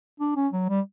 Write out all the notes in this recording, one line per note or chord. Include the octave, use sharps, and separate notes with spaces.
D4
C#4
F#3
G3